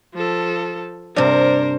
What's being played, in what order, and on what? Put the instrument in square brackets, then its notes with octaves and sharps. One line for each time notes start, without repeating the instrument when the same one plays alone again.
[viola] F3 A4
[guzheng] G2 C3 [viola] A#4 C5 [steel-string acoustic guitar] D5